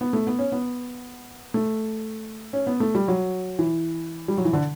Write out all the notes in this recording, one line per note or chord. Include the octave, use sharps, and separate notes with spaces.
B3
A3
B3
C#4
B3
A3
C#4
B3
A3
G3
F#3
E3
G3
F#3
E3
D3